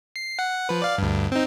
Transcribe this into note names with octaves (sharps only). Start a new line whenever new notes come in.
C7
F#5
F3 B4
D5 F5
D2 G2
C4 D#4